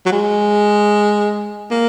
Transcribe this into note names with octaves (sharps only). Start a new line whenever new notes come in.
F#3
G#3
A#3